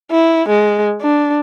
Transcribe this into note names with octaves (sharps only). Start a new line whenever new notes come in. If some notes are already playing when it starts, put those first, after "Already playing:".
E4
G#3
D4